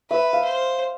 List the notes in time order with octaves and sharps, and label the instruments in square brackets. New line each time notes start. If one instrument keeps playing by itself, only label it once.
[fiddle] B4 [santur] E5
[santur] F5
[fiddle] C5